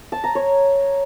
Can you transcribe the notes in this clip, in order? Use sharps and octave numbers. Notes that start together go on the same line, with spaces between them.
A5
A#5
C#5